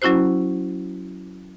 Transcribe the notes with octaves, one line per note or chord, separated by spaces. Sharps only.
F#3 C#4 E4 F#4 C5